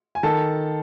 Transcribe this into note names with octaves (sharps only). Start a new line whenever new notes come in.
G#5
D#3 A4 A5